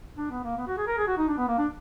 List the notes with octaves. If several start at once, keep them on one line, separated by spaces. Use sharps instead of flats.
D4
B3
A#3
B3
F#4
G#4
A#4
G#4
F#4
D#4
D4
B3
A#3
D4